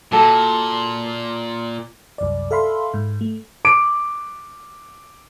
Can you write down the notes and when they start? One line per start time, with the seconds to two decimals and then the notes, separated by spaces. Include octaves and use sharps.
0.12 A#2 F#4 A4
2.18 C2 F#2 D5
2.51 A4 E5 F5 B5 C6
2.94 G#2
3.21 A3
3.65 D6 D7